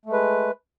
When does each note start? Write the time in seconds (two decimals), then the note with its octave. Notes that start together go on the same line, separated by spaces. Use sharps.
0.06 A3
0.09 G#3
0.13 B4